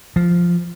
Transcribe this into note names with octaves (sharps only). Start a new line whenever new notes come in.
F3